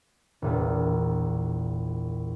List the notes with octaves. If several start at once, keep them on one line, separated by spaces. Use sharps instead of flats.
E1 A#1 F4